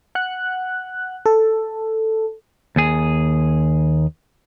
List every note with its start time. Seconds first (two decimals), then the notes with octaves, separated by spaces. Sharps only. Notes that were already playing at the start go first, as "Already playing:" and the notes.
0.15 F#5 F#6
1.26 A4
2.76 D#2 G#4